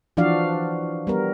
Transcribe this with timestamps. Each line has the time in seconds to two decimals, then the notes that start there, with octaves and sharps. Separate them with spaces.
0.17 E3 F3 D4 F#4 D5 F5
1.07 G3 B3 A#4